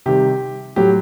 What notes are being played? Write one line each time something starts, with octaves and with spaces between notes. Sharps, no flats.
C3 D#3 G3 G4
A2 F#3 G4